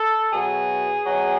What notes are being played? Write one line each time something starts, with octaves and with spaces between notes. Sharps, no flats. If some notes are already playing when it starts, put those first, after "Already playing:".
Already playing: A4
B2 F#3 G#4
B2 F#3